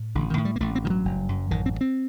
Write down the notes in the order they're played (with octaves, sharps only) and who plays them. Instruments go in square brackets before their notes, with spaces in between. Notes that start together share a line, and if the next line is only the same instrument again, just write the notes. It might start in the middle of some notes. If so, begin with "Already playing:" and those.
Already playing: [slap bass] A2
A1 D3
D#3
A2
G3
A#3
A1 A3
C4
G2 D#3
F#3
F#1
F#2
A1 D#3
C4
G2
C4